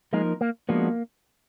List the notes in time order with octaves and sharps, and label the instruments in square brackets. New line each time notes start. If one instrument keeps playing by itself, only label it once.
[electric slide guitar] F3 A#3 D#4 A#4 [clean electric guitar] G#3
[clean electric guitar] A#3
[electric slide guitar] F3 G#3 B3 D4 F#4 [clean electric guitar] A#3